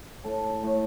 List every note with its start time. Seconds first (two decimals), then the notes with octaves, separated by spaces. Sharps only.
0.24 A2 A4
0.63 A2